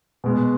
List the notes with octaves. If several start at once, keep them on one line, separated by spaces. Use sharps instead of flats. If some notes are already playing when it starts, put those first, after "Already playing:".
B2 G#3 B3